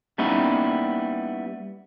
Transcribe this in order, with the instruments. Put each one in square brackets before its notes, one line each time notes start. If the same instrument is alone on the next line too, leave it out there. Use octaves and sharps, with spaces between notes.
[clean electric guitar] G3 A#3 B3 C#4 D#4 E4